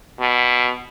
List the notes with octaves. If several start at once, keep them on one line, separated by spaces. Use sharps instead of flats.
B2